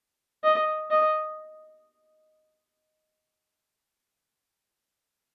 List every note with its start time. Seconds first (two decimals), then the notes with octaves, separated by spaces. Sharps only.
0.44 D#5
0.91 D#5